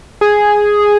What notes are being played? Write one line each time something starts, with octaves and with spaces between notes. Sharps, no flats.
G#4